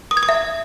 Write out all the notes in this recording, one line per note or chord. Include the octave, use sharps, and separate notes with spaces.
D#6
G#6
D#6
E5